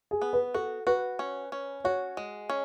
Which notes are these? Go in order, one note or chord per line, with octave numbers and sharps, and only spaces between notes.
G#4
B3
B4
F#4 A4
F#4 B4
C#4
C#4
F#4 C#5
G#3
C#4